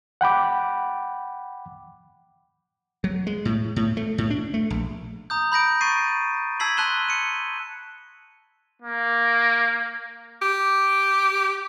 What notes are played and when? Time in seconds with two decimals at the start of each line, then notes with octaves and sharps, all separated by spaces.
0.21 F#5 G5 B5 D6
3.04 F#3
3.27 G#3
3.45 A2
3.76 A2
3.97 A3
4.18 A2
4.30 D4
4.54 A3
4.70 A#1
5.30 A#5 D#6 G6
5.52 B5 G6 A#6 D7
5.81 C#6 G6 A6 C7 D#7
6.60 A5 E6 G#6 B6 C7 F#7
6.77 A5 C6 F#6 D#7 E7 G7
7.09 C#7 D#7
8.82 A#3
10.42 G4